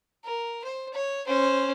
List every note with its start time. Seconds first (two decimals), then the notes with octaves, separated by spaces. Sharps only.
0.24 A#4
0.64 C5
0.94 C#5
1.27 C#4 C5